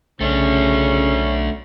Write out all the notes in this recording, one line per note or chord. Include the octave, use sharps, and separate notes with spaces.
B1 C#3 A3 C#4 D4